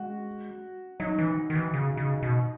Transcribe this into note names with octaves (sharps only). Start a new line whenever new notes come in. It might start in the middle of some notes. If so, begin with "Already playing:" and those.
Already playing: G#3 F#4
F#3 D#4
E3
D#3
E3
C#3
C#3
B2